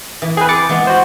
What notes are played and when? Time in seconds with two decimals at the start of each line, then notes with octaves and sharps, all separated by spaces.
0.22 E3
0.37 C4 G#4 B4
0.49 D6 A6 C#7
0.69 E3 G#3 B3
0.87 F#4 C5